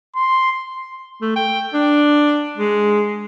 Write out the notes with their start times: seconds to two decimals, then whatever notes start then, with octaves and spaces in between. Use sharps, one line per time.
0.16 C6
1.21 A3
1.36 G5
1.74 D4
2.57 G#3